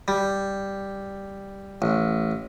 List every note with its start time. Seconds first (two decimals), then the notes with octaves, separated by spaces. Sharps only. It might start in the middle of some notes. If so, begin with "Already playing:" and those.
0.08 G3
1.82 A1